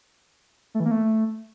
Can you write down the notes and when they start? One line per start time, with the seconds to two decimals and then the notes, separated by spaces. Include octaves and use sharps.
0.75 A3
0.80 E3
0.86 A#3
0.91 A3